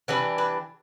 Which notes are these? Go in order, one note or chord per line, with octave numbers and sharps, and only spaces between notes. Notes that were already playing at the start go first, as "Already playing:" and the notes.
E3 G3 D4 B4
B4